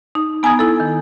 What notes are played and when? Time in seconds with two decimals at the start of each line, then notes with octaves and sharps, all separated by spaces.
0.15 D#4
0.43 B3 G#5 A#5 D#6 G#6
0.59 E4 A4
0.80 D#3